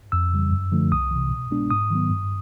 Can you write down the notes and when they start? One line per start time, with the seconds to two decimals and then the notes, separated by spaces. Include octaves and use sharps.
0.12 F2 E6
0.33 C#3 E3 G3
0.52 F#2
0.72 D3 F3 A3
0.92 C2 D#6
1.11 C3 E3
1.31 B2
1.51 G#3 B3 D4
1.70 G#2 D#6
1.90 D#3 F#3 B3
2.10 G2